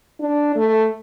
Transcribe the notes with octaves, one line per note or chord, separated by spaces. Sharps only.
D4
A3